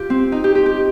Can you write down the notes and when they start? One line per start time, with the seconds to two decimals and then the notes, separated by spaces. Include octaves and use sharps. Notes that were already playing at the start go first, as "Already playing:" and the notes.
Already playing: F4 G4
0.10 C4
0.32 D#4
0.44 G4
0.55 G4
0.66 G4